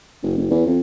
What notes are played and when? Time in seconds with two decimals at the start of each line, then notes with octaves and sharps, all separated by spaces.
0.23 F#1
0.38 F#1
0.50 E2
0.66 F2